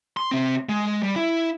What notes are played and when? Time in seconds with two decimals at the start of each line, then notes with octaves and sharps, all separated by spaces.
0.17 C6
0.31 C3 C4
0.69 G#3
1.03 G3
1.16 E4